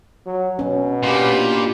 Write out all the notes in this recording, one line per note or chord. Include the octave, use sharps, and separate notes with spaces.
F#3
B2 C#4
A#2 D4 G4 B4